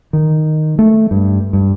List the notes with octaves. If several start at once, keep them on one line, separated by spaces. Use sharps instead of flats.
D#3
A3
G2
G2